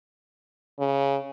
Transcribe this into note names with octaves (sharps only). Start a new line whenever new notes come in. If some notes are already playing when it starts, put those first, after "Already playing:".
C#3